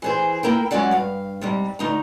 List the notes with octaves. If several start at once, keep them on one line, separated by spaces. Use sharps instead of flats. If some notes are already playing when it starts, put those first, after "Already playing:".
E3 G#4 C5
A#3 E4 A#4 G5
F#3 G#3 C#4 F#4 D5 F#5
G2 F5
G#2 C3 G3
D2 D#4 A#5